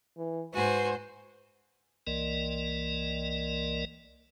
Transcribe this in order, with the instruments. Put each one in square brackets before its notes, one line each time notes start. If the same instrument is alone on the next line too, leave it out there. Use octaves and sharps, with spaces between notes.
[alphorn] E3
[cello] G#2 C5 [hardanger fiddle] F#4 G#5 [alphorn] B4
[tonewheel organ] C2 E3 A#3 A#4 D5 D#5